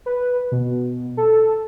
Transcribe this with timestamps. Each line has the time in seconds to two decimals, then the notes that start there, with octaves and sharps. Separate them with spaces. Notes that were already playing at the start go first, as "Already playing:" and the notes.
0.06 B4
0.52 B2
1.17 A4